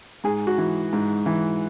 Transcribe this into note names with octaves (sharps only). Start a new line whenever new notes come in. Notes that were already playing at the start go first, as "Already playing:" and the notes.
G#2 G#4
F#4
E3
G#2
E3